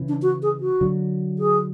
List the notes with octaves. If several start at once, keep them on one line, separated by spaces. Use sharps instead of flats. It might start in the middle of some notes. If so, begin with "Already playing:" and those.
Already playing: C#3 E3
D4
F#4
G#4
F#4
D3 F#3
G#4